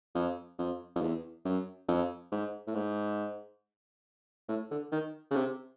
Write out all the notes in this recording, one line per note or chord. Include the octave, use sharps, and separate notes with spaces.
F2
F2
F2
E2
F#2
F2
G#2
A2
G#2
A2
D3
D#3
C#3
C3